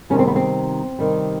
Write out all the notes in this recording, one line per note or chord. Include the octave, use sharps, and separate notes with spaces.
C3 D#3 G3 C#4
C4
B3
C4
C3 D#3 G3